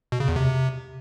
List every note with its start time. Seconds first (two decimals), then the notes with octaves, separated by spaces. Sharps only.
0.12 B2
0.20 C#3
0.28 E2
0.36 C3